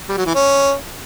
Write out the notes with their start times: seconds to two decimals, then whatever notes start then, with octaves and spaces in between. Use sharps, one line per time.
0.09 G3
0.17 F#3
0.26 E3
0.35 C#4